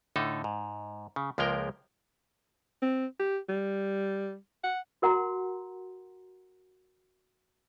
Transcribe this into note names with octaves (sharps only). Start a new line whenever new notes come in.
A2 D3 D#4 A4
G#2
C#3
C#2 F3 G#3 A#3 A#4 G5
C4
G4
G3
F#5
F#4 A#4 F#5 A#5 C6